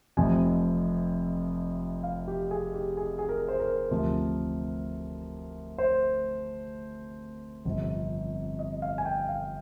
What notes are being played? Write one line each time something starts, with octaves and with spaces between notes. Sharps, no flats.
F1 F2 C3 F3 G#5
F5
G4
G#4
G4
G#4
G#4
A#4
C5
A#4
D2 C3 F3
C5
G1 F2 C3
D#5
F5
G#5
G5
F5